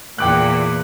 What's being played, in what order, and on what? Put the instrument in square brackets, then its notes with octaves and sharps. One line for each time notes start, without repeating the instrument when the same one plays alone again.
[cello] E2 A#2 [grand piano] G5 D6 F#6